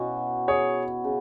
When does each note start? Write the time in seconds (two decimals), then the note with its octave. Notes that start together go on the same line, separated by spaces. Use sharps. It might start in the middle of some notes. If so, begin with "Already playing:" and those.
Already playing: B2 B3 C#4 E4 F#4
0.48 G#4 C#5
1.04 C#3